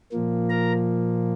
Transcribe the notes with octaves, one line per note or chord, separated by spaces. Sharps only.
A#2 F3 A#3
A#4 A#5